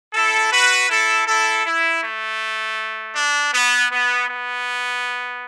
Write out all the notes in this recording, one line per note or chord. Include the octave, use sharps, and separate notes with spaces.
E4 A4
F#4 B4
E4 A4
E4 A4
E4
A3
D4
B3
B3
B3